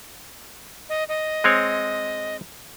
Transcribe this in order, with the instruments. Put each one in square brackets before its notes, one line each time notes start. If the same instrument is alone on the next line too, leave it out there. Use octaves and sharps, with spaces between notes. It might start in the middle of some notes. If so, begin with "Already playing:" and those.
[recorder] D#5
D#5
[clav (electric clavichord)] G#3 C4 C#5